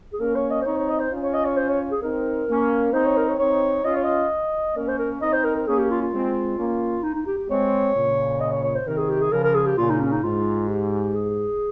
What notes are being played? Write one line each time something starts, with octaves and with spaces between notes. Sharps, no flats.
G#4
A#3 C#4 A#4
C#5
D#5
C5
C4 D#4 C#5
C#5
D#5
C5
C#4 F4
C#5
D#5
C#5
C5
C#5
G#4
C4 D#4 A#4
A#3 C#4
C4 D#4 C5
C#5
A#4
C#5
C4 D#4 C#5
C#4 F4 D#5
C#5
D#5
A#3 C#4 A#4
C5
A#4
C4 D#4 D#5
C5
A#4
A#4
A#3 C#4 G#4
G4
F4
F4
G#3 C4
A#3 C#4
D#4
D#4
G4
G4
G#3 C4 C#5
A#2 C#3
D#5
C#5
C#5
C5
C3 D#3 A#4
G#4
G4
G#4
C#3 F3 A#4
A#4
G#4
G4
A#2 C#3 F4
D#4
C#4
D#4
G#2 F4
G4
G#4